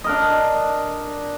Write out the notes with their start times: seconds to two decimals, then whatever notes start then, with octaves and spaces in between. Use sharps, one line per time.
0.04 D4 A#4 D#5